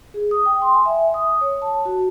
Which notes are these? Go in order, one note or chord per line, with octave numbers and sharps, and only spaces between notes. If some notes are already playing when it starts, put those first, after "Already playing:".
G#4
D#6
G5
C6
G#5
E5
D#6
C#5
A5
F#4